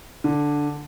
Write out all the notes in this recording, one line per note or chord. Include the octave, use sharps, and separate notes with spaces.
D3